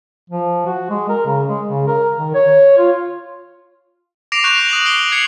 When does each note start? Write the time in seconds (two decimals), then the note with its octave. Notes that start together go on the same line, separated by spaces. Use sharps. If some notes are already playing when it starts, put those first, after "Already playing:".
0.30 F3
0.66 F#4
0.90 G#3
1.09 A#4
1.26 C#3
1.47 G#3
1.67 C#3
1.88 A#4
2.17 D#3
2.34 C#5
2.78 F4
4.32 D6 A#6 C7 D7 F7
4.44 C#6 F#6 G6 D7 F7
4.69 D#6 F#6 A#6 F#7
4.86 C7 D7 G7
5.12 G#6 C7 C#7 F#7